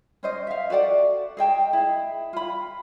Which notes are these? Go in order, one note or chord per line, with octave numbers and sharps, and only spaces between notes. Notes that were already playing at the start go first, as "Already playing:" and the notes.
C#4 C5 D#5
E5 F5
F#4 A4 D5 F#5
G#4 D#5 G5 A5
E4 G#4
F4 B5